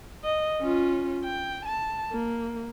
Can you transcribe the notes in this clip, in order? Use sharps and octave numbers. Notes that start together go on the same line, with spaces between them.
D#5
C#4 F4
G5
A5
A#3